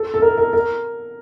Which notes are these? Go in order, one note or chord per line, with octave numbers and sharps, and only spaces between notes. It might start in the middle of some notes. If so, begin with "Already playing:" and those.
Already playing: A4
A4
A#4
A#4
A#4